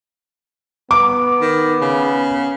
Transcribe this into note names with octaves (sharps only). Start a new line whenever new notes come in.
B3 D6
D#3
C#3